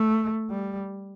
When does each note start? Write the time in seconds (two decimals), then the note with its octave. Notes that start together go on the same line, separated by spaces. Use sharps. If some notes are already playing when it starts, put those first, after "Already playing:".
Already playing: A3
0.51 G3